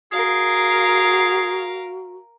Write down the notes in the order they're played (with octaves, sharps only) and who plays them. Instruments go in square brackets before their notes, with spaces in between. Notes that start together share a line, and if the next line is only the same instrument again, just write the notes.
[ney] F#4 [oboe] G#4 [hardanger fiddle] A#4 F5